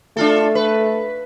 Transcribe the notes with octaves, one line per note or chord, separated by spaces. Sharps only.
A3 D4 F4 A4
B4